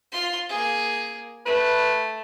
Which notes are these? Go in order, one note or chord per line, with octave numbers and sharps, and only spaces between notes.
F4 C6
A#3 G#4
A3 B4